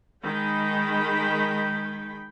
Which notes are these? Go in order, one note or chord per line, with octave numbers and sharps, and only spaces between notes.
D#3 G#3 G5 B5